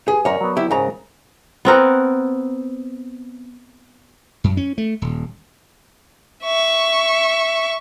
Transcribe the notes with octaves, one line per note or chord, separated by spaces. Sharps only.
G4 G#4 B4 G#5
F#2 A#4 C#5 D5
F#3 B3
E4 G4
G#2 C#3 A#4 C5 C#5 G#5 A#5
B3 C4 A#4 F#5
F#2
C#4
A3
D#1
E5 C#6